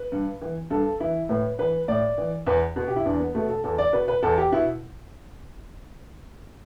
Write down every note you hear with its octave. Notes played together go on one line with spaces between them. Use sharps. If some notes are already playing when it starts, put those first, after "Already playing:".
Already playing: B4
G2
E3
G2 A4
E3 E4
A2 B4
E3 B4
A2 D5
E3
E2 B4
B2
G4
E4
E2 D4
B3
B2 A3
A4
E2 A4
D5
B2 B4
B4
E2 A4
G4
B2 E4